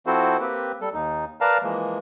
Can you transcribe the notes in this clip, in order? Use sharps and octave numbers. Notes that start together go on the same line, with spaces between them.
F3 C4 E4 F#4 A4 C5
A#3 C4 G4 B4
G3 A4
D#2 D#4
A#4 B4 D5 F5 A5 A#5
E3 F3 G#3 A#3